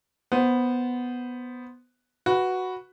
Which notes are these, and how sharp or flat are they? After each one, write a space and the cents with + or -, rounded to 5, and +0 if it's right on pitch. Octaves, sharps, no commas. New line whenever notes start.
B3 +0 C5 -10
F#4 +0 B4 +0